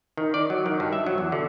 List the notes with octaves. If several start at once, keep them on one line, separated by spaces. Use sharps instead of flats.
D#3
D5
F#3
D#3
G2
E5
F#3
E2
D3